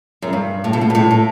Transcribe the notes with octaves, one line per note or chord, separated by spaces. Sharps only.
F#2
G2
A2
B2
A2
G2
A2
A2